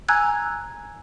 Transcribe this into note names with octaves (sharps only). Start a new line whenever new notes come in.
G#5 A#5 E6 F#6 G#6